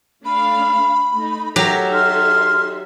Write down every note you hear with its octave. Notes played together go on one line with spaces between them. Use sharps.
A3 D4 F5 B5
A3 D#4
F#3 D#4 G4 A4 A#4 E5
C6 F6